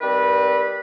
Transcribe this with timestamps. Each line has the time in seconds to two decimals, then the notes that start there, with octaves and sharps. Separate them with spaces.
0.01 D#3 G3 C4 B4